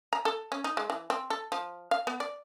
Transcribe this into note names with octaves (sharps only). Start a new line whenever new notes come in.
A#5
A4
C#4
D#4
G#3
E3
C4
A4
F3
F5
B3
D5